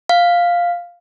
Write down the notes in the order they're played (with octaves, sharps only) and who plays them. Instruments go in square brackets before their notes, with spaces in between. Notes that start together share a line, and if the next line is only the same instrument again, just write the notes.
[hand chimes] F5